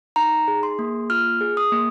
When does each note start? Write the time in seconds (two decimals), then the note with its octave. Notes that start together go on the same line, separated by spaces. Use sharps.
0.16 D#4 A#5
0.48 G#4
0.63 C6
0.79 A#3
1.10 F4 F6
1.41 G#4
1.57 D#6
1.72 A#3